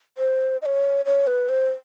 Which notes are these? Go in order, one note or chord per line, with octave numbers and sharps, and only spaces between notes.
C5
D#5
C#5
C#5
B4
C5